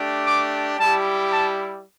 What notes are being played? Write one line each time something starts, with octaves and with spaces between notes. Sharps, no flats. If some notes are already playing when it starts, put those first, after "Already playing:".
Already playing: A3 D4 G4
D6
G3 E4 G4 A5
A5